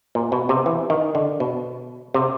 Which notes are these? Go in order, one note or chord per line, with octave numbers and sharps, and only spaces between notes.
A#2
B2
C3
E3
D#3
D3
B2
C3